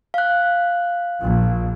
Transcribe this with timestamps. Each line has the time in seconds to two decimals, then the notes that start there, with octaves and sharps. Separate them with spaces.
0.14 F5 F#6
1.20 A#1